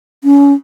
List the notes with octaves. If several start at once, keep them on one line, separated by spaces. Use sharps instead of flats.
C#4